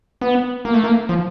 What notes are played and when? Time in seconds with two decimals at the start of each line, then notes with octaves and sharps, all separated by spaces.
0.21 B3
0.65 A#3
0.74 A3
0.84 A#3
1.09 F3